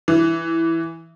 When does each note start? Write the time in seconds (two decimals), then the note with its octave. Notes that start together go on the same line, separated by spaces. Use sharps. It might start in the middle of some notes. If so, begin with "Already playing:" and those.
0.08 E3